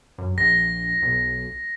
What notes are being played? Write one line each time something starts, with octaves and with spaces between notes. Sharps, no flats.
F#2
A#1 A#6
B1